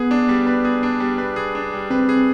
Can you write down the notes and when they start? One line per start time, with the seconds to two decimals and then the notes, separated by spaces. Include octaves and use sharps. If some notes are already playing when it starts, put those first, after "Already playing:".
Already playing: B3 G#4 B4
0.11 D4
0.29 G3
0.46 B4
0.65 G#4
0.83 D4
1.00 G3
1.18 B4
1.36 G#4
1.55 D4
1.73 G3
1.90 C4 B4
2.09 G#4